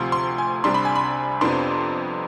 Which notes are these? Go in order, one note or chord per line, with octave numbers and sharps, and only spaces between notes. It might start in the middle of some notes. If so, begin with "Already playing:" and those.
Already playing: D2 C3 F3 C6
C6
G#5
C2 C3 G3 D4 C6
B5
G#5
B5
F2 C3 F3 B3 D4 C6